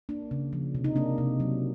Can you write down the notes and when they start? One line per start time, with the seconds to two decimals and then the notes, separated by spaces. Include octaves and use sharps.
0.09 A#3 D4
0.31 C#3
0.53 F3
0.75 C3
0.84 D#4
0.96 A#3 D4
1.18 C3
1.40 F#3